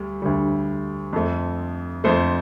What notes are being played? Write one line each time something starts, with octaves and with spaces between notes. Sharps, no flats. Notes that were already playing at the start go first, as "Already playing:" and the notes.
Already playing: D2 G3
D2 D3 G3
F2 F3 A3
F2 F3 A3 C5